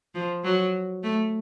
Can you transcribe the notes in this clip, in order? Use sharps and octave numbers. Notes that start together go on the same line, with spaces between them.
F3
F#3
A3